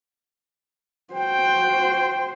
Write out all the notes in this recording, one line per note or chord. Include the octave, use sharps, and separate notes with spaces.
F#4 C5 G5